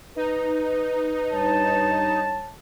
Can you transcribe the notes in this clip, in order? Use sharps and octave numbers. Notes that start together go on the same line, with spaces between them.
D#4 B4
G2 C#5 A5